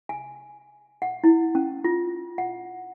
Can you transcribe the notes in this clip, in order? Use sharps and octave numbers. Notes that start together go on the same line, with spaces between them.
G#5
F#5
E4
C#4
F4
F#5